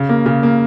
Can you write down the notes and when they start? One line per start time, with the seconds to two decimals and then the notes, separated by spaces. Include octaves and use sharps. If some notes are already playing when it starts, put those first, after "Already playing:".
Already playing: C#3
0.09 A#3
0.26 C#3
0.43 A#3